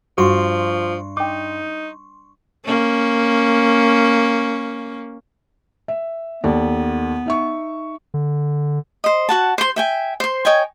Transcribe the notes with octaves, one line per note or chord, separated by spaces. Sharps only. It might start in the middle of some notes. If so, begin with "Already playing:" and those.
G2 F3 F#4 C6 C#6
D#4 G5 D6
A#3 C#4
E5
D#2 B3 A4 D5
D#4 E5 C#6
D3
C5 D#5
F#4 F#5 A5
C5 C6
E5 G5 G#5
C5 C6
C#5 D#5 G5 G#5